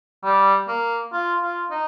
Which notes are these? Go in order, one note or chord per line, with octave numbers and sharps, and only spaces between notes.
G3
A#3
F4
F4
D#4